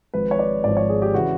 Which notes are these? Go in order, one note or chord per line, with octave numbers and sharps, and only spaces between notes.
G#1 G#2 F3 B4
C#5
D5
G#1 G#2 F3 D5
C#5
G#4
G4
C#3 E3 F#4